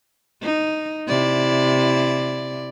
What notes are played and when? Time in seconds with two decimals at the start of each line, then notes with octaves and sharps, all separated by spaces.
0.42 D#4
1.08 C3 E4 D5